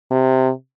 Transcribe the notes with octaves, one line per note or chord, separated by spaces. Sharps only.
C3